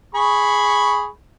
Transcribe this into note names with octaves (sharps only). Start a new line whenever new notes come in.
G#4 B5 C#6